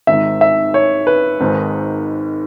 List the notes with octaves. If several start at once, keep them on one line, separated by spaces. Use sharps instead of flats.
G#1 G#2 D#3 E5
E5
C#5
B4
G#1 G#2 D#3